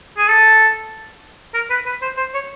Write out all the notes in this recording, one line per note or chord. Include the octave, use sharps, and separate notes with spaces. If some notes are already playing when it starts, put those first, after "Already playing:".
G#4
A4
A#4
B4
B4
C5
C5
C#5